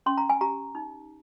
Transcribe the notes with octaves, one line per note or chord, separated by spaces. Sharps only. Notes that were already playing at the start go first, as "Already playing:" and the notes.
C#4 C6
A#5
G#5
G4 A#5
D#4